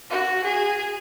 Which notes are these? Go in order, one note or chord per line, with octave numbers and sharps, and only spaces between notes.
F#4
G#4